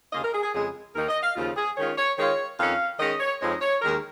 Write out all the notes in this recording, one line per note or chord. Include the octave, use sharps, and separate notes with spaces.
D#2 C#3 A#3 F4 D#5
A#4
G#4
G#4
F2 C#3 G#3 G#4
D#2 D#3 A#3 A#4
D#5
F5
D#2 C#3 F3 F4
G#4
D#3 G#3 C#4 F4 C#5
C#5
D#3 G#3 F4 C#5
F2 D#3 C#4 F5
D#3 G#3 C#4 D#5
C#5
F2 F3 G#3 D#4 C#5
C#5
D#2 D#3 G#3 A#4